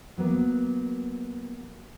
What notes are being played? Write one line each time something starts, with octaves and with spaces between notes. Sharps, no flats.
F#3 A#3 B3